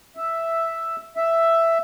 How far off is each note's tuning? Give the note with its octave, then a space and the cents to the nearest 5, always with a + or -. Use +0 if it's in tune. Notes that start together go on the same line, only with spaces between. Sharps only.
E5 +0
E5 +5